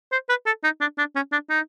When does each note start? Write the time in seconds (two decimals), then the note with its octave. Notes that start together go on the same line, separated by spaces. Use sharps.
0.12 C5
0.29 B4
0.46 A4
0.64 D#4
0.81 D4
0.98 D4
1.15 C#4
1.32 D4
1.49 D#4